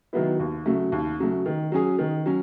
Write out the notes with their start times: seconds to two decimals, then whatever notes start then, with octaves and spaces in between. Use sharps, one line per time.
0.13 D#3 F#3 B3 E4
0.40 D#2
0.66 C#3 F#3 A3
0.92 D#2
1.20 C#3 F#3 A3
1.46 D#3
1.72 F#3 C#4 G#4
1.99 D#3
2.26 F#3 C#4